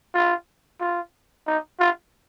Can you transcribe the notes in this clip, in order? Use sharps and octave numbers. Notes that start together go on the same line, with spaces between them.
F4
F4
D#4
F4